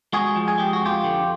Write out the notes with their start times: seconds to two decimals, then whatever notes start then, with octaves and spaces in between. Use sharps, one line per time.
0.13 G#3 F#4 G#4
0.36 F3
0.48 G#4
0.58 G#3 G4
0.73 F#4
0.81 F2 F4 G4
1.04 D3